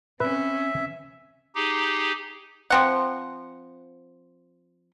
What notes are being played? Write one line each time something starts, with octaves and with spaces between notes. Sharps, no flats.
C4 C#4 B4 E5
D#4 G4 G#4
F3 C4 F#5